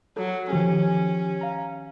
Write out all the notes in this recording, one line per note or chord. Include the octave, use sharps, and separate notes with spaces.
F#3 A4
D#3 F3 C#4 G4
F5 A#5